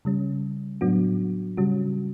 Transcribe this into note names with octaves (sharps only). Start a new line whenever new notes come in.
C#3 G3 C#4
A2 F#3 B3 D4 F#4
C#3 G3 C#4 F#4